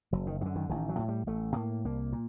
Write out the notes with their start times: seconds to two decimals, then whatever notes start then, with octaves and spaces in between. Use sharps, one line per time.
0.13 F#1 F#3
0.27 D#3
0.41 F#2 D3 D#3
0.56 D#3
0.70 A1 D#3
0.89 F#3
0.99 A2
1.08 G3
1.27 A1 A3
1.56 A2 A#3
1.85 C2 A#3
2.13 A#2